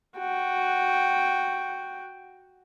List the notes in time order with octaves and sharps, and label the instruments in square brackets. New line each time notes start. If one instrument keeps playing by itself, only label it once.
[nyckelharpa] F#4 G5